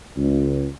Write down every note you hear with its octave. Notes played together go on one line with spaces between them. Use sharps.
C#2